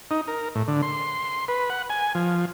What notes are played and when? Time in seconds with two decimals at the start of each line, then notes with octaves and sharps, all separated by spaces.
0.11 D#4
0.28 A#4
0.55 A2
0.68 D3
0.83 C6
1.48 B4
1.70 F#5
1.90 G#5
2.15 F3